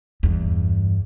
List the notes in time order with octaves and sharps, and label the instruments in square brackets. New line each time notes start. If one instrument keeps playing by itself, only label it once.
[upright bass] E2 G2